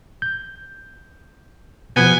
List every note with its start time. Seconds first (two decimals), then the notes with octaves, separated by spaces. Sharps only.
0.22 G6
1.97 B2 F3 B3 G#5